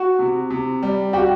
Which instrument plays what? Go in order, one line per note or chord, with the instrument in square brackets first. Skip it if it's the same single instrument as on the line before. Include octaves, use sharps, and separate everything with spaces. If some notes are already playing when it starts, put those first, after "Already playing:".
Already playing: [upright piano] F#4
[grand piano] C3
C3
G3
[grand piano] F#4 [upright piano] G4